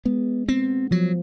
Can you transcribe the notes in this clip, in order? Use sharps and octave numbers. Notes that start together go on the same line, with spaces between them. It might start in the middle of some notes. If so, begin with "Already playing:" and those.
G#3 B3
B3 C4
F3 F#3